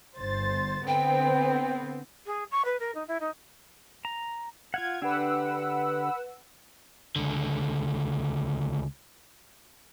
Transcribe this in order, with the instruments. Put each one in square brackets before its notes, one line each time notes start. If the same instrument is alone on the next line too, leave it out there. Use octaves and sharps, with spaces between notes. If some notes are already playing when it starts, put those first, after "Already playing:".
[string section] G1 C5 A6
[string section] D3 B3 C4 [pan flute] G5
[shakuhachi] G#4
C#6
B4
A#4
D#4
E4
D#4
[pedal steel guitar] A#5
[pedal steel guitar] F4 F5 F#5 [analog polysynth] G#6
[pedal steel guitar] D3 D4 G4 [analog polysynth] B4 F#5 E6
[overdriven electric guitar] C#2 D3